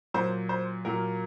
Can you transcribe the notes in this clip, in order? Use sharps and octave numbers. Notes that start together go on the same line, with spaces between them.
A#2 F#3 C5
C5
A#2 F#3 A#4